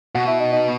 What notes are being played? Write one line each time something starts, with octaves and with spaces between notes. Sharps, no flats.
B2 F#4
E4
D#4
D#4